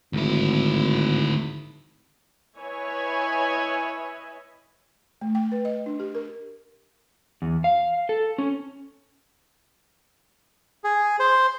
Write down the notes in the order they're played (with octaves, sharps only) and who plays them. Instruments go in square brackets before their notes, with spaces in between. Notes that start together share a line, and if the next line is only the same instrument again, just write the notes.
[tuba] G#1 [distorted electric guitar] D2 E4
[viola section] E4 B4 C#5 D#5 E5 G#5
[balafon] A3
G5
B4
D#5
D4
G4
A#4
[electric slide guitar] E2
F5
A4
C#4
[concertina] G#4
C5